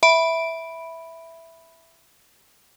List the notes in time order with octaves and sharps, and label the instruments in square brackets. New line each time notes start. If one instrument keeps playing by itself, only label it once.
[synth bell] E5 B5 D7